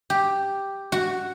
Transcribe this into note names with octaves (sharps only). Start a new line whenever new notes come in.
G4
F#4